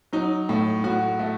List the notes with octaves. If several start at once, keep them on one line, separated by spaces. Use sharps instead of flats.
F#3 D#4
A2
A2 F#4
A3